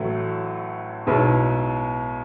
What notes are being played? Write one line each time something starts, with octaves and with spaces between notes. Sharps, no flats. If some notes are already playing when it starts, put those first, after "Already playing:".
Already playing: A1 A2 F#3 A3
B1 B2 G#3 B3 E4